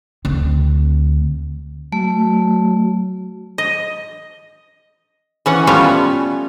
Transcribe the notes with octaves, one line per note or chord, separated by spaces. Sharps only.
D2 C4
F#3 A3
D#5
E3 C#4 F#5
G3 A3 B3 C#4 F4 C#5